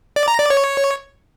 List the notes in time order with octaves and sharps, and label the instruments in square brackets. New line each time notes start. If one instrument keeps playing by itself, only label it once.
[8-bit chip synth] D5
A#5
D5
C#5